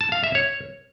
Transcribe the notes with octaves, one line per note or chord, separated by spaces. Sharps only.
A5
F5
E5
C#5